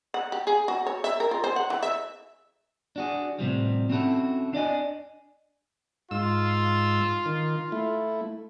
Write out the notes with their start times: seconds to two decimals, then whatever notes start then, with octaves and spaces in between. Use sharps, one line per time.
0.14 F#5
0.32 G4
0.47 G#4
0.68 F#4
0.87 C#5
1.04 E5
1.20 A#4
1.31 F4
1.44 C5
1.56 F#5
1.70 E3
1.83 E5
2.96 D4 F#4 G#4
3.38 A2 C3 F3 G3
3.90 C4 C#4 E4 F#4 A4
4.53 D4 D5 D#5 G#5
6.11 G#2 F4 E6
7.26 D#3
7.72 A3 E4